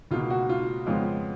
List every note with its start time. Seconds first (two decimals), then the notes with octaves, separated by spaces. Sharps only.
0.11 C#2 B2 A#3 F4
0.30 F#4
0.49 F4
0.86 F2 C#3 G#3 B3 F4